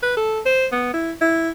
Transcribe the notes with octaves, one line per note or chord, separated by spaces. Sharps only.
B4
A4
C5
B3
E4
E4